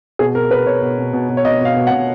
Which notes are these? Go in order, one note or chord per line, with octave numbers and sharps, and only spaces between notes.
B2 G#4
B2 A#4
B2 B4
B2 C#5
B2
B2
B2
B2
C#5
B2 D#5
B2 F5
B2
F#5
B2